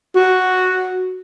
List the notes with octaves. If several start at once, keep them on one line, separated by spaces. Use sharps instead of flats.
F#4